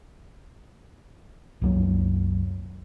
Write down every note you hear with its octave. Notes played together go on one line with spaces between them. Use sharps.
C2 F#2 F#3 A#3